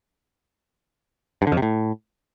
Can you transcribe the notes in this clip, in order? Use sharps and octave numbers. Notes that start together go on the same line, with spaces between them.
G2
D3
F2
C3
A2